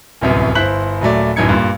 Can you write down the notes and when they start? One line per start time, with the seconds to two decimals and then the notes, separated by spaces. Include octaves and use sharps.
0.21 D1 C2 F#2 B3
0.55 G1 E4 C5 F#6 B6 F#7
1.01 D#1 F#3 A3 D5
1.36 D1 A1 F#2 D#4 G#6 C#7
1.49 G2 A#2